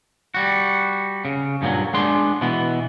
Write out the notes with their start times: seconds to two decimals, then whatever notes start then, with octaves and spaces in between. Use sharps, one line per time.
0.34 G3 F#4
1.25 C#3
1.62 G2 A#2 F3 F#3
1.94 G#3 B3 D4 C6
2.41 B2 E3 B3